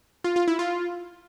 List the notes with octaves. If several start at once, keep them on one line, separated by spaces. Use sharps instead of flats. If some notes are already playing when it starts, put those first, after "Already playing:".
F4
F4
E4
F4